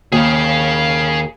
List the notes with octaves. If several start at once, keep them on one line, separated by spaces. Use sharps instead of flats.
D#2 G#4 F5